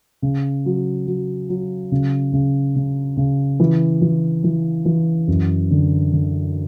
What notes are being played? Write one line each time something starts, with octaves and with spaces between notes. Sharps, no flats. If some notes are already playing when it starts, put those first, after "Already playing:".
C#3
F#3
F#3
F#3
C#3
C#3
C#3
C#3
E3
E3
E3
E3
F#2
D3
D3